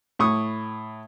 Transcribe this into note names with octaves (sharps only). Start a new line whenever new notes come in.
A2 C#6 D#6